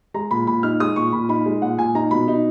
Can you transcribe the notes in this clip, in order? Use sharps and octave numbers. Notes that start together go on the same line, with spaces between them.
G#3 A#5
A#2 B5
A#2 B5
D#4 F6
G#3 D#6
A#2 C#6
A#2 B5
D#4 B5
G#3
A#2 F#5
A#2 G#5
D#4 A#5
B2 B5
D#4